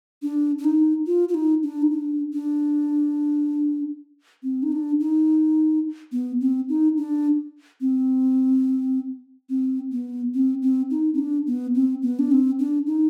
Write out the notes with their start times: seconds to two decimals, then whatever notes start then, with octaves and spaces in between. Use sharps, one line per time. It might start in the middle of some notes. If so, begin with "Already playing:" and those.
0.22 D4
0.58 D4
0.64 D#4
1.07 F4
1.29 F4
1.34 D#4
1.63 D4
1.82 D#4
1.91 D4
2.33 D4
4.43 C4
4.63 D#4
4.72 D4
5.00 D#4
6.12 B3
6.41 C4
6.69 D#4
6.98 D4
7.81 C4
9.49 C4
9.92 B3
10.34 C4
10.62 C4
10.90 D#4
11.14 C4
11.19 D4
11.47 B3
11.75 C4
12.02 B3
12.19 D4
12.32 C4
12.59 D4
12.87 D#4